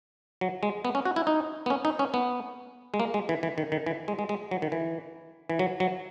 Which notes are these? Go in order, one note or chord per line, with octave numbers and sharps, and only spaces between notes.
F#3
G#3
B3
C#4
F#4
E4
D#4
B3
C#4
D#4
C#4
B3
G#3
A#3
G#3
E3
E3
D#3
D#3
E3
G#3
G#3
G#3
F#3
D#3
E3
E3
F#3
F#3